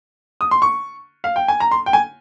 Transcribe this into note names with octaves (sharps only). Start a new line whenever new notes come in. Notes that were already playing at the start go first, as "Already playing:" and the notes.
D#6
C6
C#6
F5
G5
G#5
A#5
C6
G5
G#5